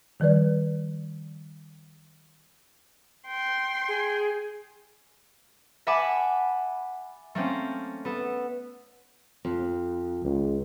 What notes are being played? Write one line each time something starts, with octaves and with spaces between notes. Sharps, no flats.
D#3 F3 G3 B4 D5
G5 C6
G#4
E5 F#5 G#5 A5 B5 D6
A3 A#3 C4 C#4
B3 A4
F2
C#2